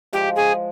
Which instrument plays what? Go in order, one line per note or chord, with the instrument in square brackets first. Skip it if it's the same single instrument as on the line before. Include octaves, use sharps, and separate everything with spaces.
[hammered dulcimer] F3 G#3 [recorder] G4
[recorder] G#4